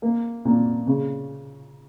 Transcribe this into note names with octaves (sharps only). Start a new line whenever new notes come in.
A#3
A#2
C#3